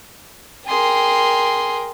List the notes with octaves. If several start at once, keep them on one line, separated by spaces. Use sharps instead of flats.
G#4 A#4 G5 C6